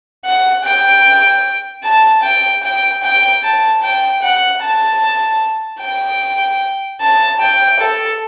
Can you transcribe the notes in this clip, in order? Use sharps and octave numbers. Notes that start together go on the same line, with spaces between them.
F#5
G5
A5
G5
G5
G5
A5
G5
F#5
A5
G5
A5
G5
A4